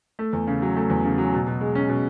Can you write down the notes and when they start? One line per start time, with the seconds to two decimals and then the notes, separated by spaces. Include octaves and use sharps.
0.19 A3
0.33 E2
0.47 C#3
0.62 F#3
0.76 A3
0.90 E2
1.05 C#3
1.18 F#3
1.33 B2
1.47 B2
1.61 G#3
1.75 C#4
1.89 B2